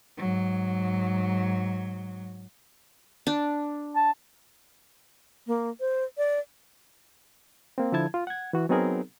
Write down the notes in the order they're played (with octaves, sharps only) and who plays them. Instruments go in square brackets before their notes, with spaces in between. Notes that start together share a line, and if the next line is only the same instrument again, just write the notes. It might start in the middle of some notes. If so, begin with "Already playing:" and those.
[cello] G#2 F#3
[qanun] D4
[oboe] A5
[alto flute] A#3
C5
D5
[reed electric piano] A#3 C4
D3 F3 E4 A5 G#6
F4
F#5 G#6
E3 F#4
F#3 B3 C4 D#4 G#4 A#4